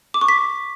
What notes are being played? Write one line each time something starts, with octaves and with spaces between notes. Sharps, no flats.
D6
C#6
B6